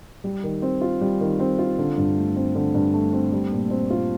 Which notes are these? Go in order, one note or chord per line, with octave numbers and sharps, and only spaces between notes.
G3
D#3
C4
F4
G3
D#3
C4
F4
D3
G2
A3
C4
D3
G2
A3
C4
G3
A#2
C4
F4